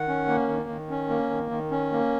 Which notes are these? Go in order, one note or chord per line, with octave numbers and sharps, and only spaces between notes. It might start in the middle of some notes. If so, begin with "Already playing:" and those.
Already playing: D#3 F#5
C#4
A#3
D#3
D#3
C#4
A#3
D#3
D#3
C#4
A#3